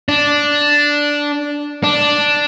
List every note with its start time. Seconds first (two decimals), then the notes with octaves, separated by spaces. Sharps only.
0.09 D4
1.84 D4